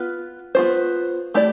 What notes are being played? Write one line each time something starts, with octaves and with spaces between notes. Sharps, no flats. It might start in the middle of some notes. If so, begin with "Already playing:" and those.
Already playing: B3 F4 B4
B3 F4 C5
A3 E4 G4 D5